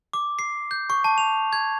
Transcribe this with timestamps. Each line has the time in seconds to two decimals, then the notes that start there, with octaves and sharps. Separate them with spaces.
0.13 D6
0.39 C7
0.71 G6
0.90 C#6
1.04 A5
1.18 F7
1.53 G#6